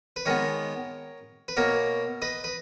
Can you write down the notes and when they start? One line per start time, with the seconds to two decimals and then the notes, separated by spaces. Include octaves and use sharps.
0.16 B4
0.25 D#3 G#3 B3 A#4 C#5
1.48 B4
1.57 B2 A#3 A#4 C#5
2.22 B4 D#5
2.44 B4